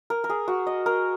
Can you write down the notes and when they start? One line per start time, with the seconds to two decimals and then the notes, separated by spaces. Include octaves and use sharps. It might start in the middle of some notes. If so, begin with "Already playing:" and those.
0.10 A#4
0.24 A#4
0.30 G#4
0.48 F#4
0.67 D#5
0.86 A#4